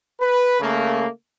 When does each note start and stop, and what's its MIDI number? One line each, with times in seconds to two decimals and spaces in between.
0.20 0.58 71
0.60 1.07 49
0.60 1.07 57
0.60 1.07 58